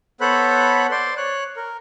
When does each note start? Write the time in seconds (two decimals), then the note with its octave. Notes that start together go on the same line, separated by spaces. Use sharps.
0.21 B3 A4 C5 C#5 B5 F#6
0.91 C5 D5 C6
1.17 C#5 F#6
1.57 A#4